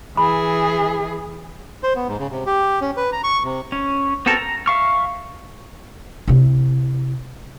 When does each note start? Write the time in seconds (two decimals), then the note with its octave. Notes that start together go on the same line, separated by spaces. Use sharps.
0.17 E3 G#4 B5
1.83 C5
1.96 B3
2.08 G#2
2.19 C#3
2.31 C3
2.46 G4
2.81 C#4
2.97 B4
3.12 A#5
3.24 C#6
3.44 C3
3.72 C#4
4.26 B3 C4 F#4 A4 A#4
4.37 A#5
4.66 E5 F5 C#6 F6
6.28 C3 E4